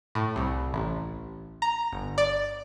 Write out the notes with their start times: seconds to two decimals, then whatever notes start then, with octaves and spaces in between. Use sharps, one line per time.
0.15 A2
0.36 C2
0.74 A1
1.62 A#5
1.93 G1
2.18 D5